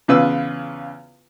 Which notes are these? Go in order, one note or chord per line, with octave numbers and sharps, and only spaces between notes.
E2 C#3 F4 B4 E6